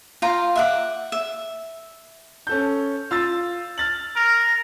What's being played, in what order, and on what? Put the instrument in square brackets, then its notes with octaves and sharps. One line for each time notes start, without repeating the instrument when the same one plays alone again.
[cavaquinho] F4 F5 G5 A#5
E5 F#5 D6
E5
[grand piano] C#4 A4 G6
F4 E6 A6
F6 A6 F#7
[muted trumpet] A#4